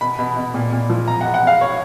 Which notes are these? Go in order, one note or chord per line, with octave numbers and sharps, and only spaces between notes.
B2 B5
B2
B2
A#2
A#2
F3
B2 A#5
F#5
B2
F#5
B2 F5
B2 C#5